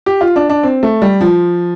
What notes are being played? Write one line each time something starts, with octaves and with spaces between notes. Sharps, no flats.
G4
F4
D4
D4
C4
A3
G3
F3